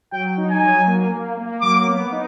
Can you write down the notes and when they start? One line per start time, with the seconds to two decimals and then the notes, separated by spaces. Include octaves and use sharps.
0.12 F#3 G5
0.37 D#4
0.50 G#5
0.63 F#3
0.87 A#3
1.12 A#3
1.37 A#3
1.61 F#3 D6
1.88 B3
2.12 D#4